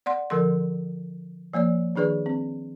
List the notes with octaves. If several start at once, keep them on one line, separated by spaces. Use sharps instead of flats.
D5 F#5 C6
D3 F3 A4 A#4 C6
F3 A#3 C#5 D5
D#3 D4 G#4 B4 D5
C4